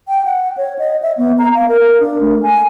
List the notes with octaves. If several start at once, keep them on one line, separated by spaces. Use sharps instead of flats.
G5
F#5
C#5
D#5
E5
B3
A#5
F5
A#4
D4
A3
G#5